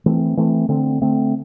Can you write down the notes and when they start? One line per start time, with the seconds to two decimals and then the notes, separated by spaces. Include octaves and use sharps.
0.06 E3 A3 C4
0.37 E3 A3 C4
0.69 D3 A3 C4
1.01 D3 A3 C4